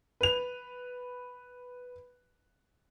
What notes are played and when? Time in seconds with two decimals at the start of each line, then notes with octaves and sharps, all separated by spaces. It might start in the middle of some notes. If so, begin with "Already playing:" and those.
0.21 B4 F7